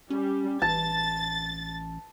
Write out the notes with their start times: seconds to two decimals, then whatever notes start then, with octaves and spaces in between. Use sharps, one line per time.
0.10 G3 C#4
0.62 A1 A5 A6